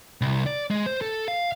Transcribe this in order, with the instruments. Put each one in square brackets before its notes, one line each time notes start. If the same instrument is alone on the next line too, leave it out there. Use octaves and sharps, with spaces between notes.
[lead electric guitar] C2
D5
G#3
C5
A4
F5